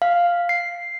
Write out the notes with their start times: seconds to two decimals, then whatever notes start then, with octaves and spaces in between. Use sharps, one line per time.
0.02 F5
0.49 C7